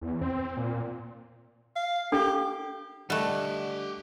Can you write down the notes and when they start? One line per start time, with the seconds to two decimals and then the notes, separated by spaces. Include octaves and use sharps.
0.01 E2
0.21 C4
0.57 A#2
1.76 F5
2.12 D4 G4 A4
3.10 D3 G3 A3 D4 G4 D#5 F#5 F#6